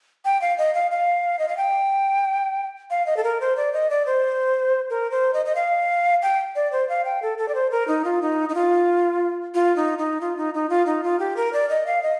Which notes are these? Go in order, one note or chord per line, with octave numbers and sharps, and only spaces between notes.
G5
F5
D#5
F5
F5
D#5
F5
G5
F5
D#5
A4
A#4
C5
D5
D#5
D5
C5
A#4
C5
D#5
D#5
F5
G5
D5
C5
F5
G5
A4
A4
D5
C5
A#4
D#4
F4
D#4
D#4
F4
F4
D#4
D#4
F4
D#4
D#4
F4
D#4
F4
G4
A#4
D5
D#5
F5
D#5